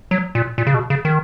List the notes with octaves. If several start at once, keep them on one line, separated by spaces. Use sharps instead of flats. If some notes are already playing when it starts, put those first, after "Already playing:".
F#3
A#2
A#2
C#3
B2
C#3
D#3